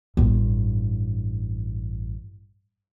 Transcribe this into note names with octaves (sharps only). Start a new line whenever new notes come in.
A1 G2